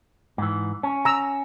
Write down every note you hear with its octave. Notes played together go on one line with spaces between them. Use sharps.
G#2 E3
C#4
A#5 E6